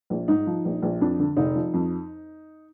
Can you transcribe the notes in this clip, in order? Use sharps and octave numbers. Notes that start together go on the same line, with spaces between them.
A#1
G#2 D#4
F3
A#1
A#1
F2 D4
D3
F1 D#4
F3
F2